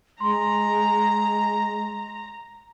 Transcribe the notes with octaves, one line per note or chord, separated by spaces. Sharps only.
G#3 A#5 C6